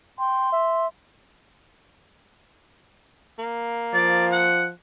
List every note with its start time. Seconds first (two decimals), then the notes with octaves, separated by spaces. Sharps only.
0.19 G5 C6
0.52 E5
3.39 A#3
3.94 F3 D5
4.32 F#5